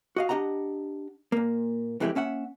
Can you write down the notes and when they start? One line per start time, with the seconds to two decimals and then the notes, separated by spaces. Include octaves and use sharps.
0.16 F#4 D#5 F5
0.29 D4 G4 D#5 F#5 A#5
1.32 A#2 A#3
2.00 F2 E3 G#3 A3 E4 G4
2.15 A#3 C#4 E5 F#5